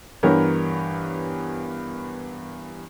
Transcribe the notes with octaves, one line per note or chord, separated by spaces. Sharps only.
G2 E3 B3 G4 A#4 C#5